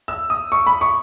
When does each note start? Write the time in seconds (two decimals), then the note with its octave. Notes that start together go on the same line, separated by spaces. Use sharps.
0.08 E6
0.30 D#6
0.52 C#6
0.67 B5
0.81 C#6